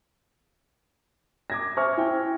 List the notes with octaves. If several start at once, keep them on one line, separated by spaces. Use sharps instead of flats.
D6 G#6 A#6
C5 E5 G#5 C#6 F6 G#6
E4 E5 G5